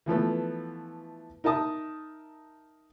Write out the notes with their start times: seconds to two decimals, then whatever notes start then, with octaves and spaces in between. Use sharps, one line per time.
0.06 E3 F3 A3 B3
1.44 D#4 A#4 E5 A5 D#6